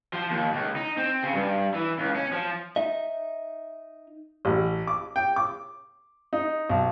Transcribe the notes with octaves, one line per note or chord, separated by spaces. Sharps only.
F3
D#2
C#2
D#4
C4
C#3
G2
E3
C#2
C#4
F3
D#4 D#5 E5
A1
D6
G5
D6
D#4
B1